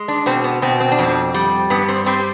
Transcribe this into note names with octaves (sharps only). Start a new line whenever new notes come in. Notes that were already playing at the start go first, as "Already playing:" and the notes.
Already playing: G#3
D4
B2 C4
B3
B2 C4
C4
D4
F2 C4
G3
G2 B3
C4
G3 C4